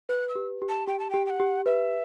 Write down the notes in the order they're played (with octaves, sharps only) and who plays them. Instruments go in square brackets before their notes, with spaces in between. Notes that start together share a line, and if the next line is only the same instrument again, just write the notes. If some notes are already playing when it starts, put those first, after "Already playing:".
[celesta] B4 [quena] F#6
[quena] E6
[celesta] G4
G4
[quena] A5
[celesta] G4 [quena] G5
[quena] A5
[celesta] G4 [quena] G5
[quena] G5
F#5
[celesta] G4
[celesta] B4 [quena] E5